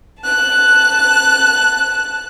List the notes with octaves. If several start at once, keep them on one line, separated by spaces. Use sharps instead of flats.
A5 F#6